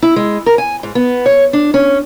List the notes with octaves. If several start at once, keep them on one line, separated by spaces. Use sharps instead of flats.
E4
G#3
A#4
G#5
G#2
B3
C#5
D4
C#4